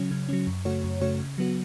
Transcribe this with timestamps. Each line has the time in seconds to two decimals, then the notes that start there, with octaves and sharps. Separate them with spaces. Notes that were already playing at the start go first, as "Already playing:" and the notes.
Already playing: C#3 F#3 C#4
0.11 C#3
0.29 F#3 C#4
0.47 F#2
0.65 C#3 A3 F#4 C#5
0.84 F#2
1.01 C#3 A3 F#4 C#5
1.19 C#3
1.38 F#3 B3 F#4